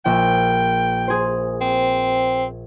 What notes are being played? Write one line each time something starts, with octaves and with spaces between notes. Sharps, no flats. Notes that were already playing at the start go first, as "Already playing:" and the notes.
A#1 E5 G5
G#4 C5
C4